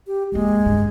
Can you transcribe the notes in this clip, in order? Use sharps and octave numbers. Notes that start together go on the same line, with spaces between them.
G4
D#2 G#3 A#3
D2 G2